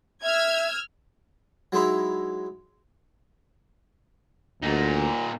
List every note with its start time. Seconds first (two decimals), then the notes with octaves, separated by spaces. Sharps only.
0.23 E5 E6 F6 G#6
1.72 F#3 G#3 D#4 E4
4.63 D2 A#2 D#4